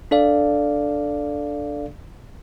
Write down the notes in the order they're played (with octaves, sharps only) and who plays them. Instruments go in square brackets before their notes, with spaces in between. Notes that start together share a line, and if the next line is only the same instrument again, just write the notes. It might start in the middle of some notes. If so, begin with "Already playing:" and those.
[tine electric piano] D4 A4 D5 F5